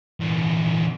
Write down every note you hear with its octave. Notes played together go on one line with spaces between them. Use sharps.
E2 A#2